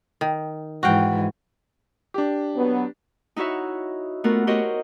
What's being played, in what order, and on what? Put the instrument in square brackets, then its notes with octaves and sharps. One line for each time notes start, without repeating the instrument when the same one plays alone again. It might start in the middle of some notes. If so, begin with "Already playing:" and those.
[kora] D#3
[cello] G#2 E3 [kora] F#4 F5 G5
[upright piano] D4 G4
[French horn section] F#3 B3
[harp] D#4 E4 F#4 C#5 E5
A3 B3 F4 F#4 A#4
F#4 G4 A#4 C5 C#5 D#5